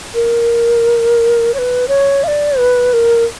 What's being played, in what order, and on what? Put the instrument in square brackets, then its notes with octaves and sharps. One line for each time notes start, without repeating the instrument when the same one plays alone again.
[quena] A#4
C#5
B4
C#5
F5
D5
B4
A#4